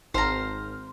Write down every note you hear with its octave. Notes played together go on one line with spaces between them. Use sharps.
G#1 C5 A#5 F6